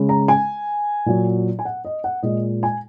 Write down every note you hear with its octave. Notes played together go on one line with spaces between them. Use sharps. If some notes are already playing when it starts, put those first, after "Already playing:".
Already playing: C#3 G#3
A#5
G#5
A#2 F#3
G#5
F#5
D#5
F#5
A#2 G#3 D#5
G#5